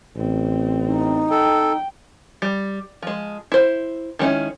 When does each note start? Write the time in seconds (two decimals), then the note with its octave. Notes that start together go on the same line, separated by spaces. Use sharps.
0.17 A1 C4
0.87 D#4
1.31 A4 G5
2.42 G3
3.02 F3 G#3
3.52 E4 C5
4.19 D#3 G#3 C4 C#4 E4